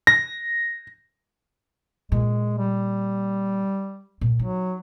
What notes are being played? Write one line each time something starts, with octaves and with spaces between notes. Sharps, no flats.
A#6
A#2 G#3
G3
A#2
F#3 D#4